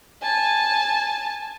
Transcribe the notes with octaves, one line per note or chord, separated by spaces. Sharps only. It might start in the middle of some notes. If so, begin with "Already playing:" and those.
G#5 A5